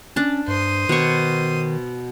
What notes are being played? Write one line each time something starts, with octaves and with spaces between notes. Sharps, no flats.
C#4 D4 A5
G2 C5 D#6
B2 D#3 C#6